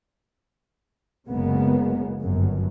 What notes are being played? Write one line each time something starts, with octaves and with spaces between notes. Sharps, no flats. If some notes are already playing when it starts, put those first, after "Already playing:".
F#1 C2 C#3 G#3 A#3 B3
G1 F#2